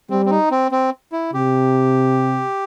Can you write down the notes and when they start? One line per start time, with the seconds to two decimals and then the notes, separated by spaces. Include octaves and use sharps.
0.10 G3 C4
0.26 C4
0.30 D#4
0.51 C4
0.72 C4
1.12 E4
1.34 C3 G4